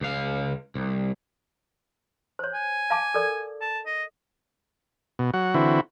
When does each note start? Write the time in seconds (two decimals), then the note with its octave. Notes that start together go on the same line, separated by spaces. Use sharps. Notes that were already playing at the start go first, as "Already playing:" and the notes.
0.01 C#2 F5
0.75 C2
2.39 C5 C#5
2.54 G#5
2.90 F5 A5 D6
3.14 A4 A#4 D5
3.61 A5
3.86 D#5
5.19 B2
5.34 F#3 F#5
5.54 D3 E3 C4 E4 F#4